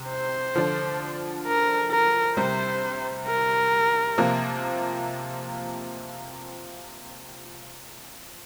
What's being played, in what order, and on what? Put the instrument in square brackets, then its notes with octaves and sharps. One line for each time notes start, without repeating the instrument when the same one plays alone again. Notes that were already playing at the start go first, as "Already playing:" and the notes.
Already playing: [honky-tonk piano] C3
[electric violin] C5
[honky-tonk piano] D3 F3 D4
[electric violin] A#4
A#4
[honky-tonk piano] C3 G3 C4 [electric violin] C5
[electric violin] A#4
[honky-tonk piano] C3 F3 A#3